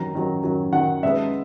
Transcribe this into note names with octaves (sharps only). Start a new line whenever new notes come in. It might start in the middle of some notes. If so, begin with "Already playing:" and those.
Already playing: F#2 D#3 F#3 A#5
F#2 D#3 F#3
F#2 D#3 F#3
F#2 D#3 F#3 F#5
C#3 G#3 B3 E5